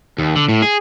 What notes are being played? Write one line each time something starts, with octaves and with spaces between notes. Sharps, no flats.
D#2
D3
A2
G#4